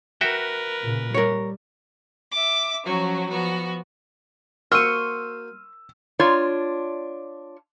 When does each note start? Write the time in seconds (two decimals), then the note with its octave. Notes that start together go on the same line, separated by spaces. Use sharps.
0.21 F#4 A#4 B4 E5 G5
0.82 A#2 C#3
1.14 G3 A#4 C#5
2.31 E5 D6
2.85 F3 F#3 C#4 F#4
3.29 F3 B3 F#4
4.72 A#3 F#4 C5 C6 C#6 E6 F6 D#7
6.19 D4 F4 C#5 D5